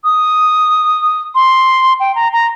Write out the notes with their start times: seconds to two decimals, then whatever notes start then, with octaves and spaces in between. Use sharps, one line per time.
0.04 D#6
1.35 C6
2.00 G5
2.15 A#5
2.33 A#5